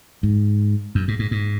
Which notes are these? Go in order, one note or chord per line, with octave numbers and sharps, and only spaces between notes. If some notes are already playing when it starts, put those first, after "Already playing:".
G#2
F#2
G#2
G#2
G#2